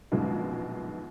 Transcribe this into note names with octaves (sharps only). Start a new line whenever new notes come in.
A#1 F#2 B2 D#3 G#3